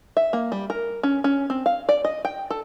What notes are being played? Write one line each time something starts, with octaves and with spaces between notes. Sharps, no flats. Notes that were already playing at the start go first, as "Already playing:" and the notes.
E5
A#3
G3
A#4
C#4
C#4
C4
F5
D5
D#5
G5
A4